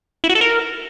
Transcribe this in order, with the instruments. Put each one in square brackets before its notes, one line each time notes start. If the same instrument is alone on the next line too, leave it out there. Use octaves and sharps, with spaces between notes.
[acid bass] E4
F#4
A4
A#4